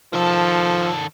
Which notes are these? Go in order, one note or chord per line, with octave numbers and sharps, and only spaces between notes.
D#3 F3 A4